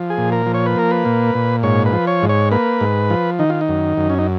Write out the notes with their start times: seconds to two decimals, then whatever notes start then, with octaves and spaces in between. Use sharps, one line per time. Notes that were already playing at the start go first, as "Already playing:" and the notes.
Already playing: F3
0.10 G#4
0.18 A#2
0.32 A#4
0.46 F3
0.54 C#5
0.66 B4
0.76 A#3 A#4
0.91 B4
1.05 A#2
1.35 A#2
1.63 G#2 C#5
1.86 B4
1.93 F3
2.07 C#5
2.23 G#2
2.29 C#5
2.51 A#3 B4
2.81 G#2
3.10 F3
3.39 D#3 D#4
3.50 F4
3.61 D#4
3.68 F#2
3.97 F#2
4.10 C#4
4.18 D#4